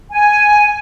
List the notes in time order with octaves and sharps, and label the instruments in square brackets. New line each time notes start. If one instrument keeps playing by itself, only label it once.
[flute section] G#5